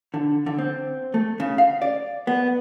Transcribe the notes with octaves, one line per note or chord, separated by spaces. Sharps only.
D3
D3
C4
A3
C#3
F5
D5
B3